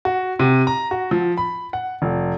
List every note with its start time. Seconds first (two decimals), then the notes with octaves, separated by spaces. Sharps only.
0.05 F#4
0.39 C3
0.67 A#5
0.91 F#4
1.11 F3
1.37 B5
1.73 F#5
2.02 F1